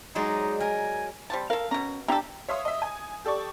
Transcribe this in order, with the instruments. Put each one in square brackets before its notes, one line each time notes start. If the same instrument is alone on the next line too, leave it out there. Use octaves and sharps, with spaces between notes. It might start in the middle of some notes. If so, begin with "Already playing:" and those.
[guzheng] F#3 G#3 D5 [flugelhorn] D#4
[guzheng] A#4 [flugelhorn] G#5
[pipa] G3 C4 A5
[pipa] A4 F5 [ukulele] A#4
[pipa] B2 A#5 [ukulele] C#4
[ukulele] D4 G4 A#5 [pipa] E4 A4
[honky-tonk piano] C#5 E5 F5 C6 D#6
D#5 E5
G#5
G4 A4 D5 C#6